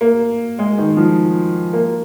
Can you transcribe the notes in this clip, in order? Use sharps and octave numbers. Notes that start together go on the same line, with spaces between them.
A#3
G#3
D#3
F3
A#3